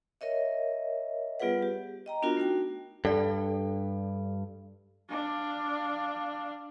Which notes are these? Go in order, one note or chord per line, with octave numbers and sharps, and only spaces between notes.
A#4 C#5 D#5 E5
G3 B3 F4 G#4 B4 F#5
G4
D#5 G5 A#5
B3 D4 F4 F#4 A#4
A3 D#4 F#4 G5
G2 A4 D5
D4 F5